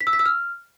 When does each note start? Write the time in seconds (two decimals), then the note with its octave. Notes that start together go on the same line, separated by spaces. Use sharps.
0.01 B6
0.07 E6
0.13 B6
0.19 E6
0.26 F6